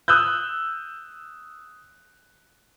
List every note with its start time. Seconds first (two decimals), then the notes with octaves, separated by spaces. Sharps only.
0.08 D#6 E6 F#6 G6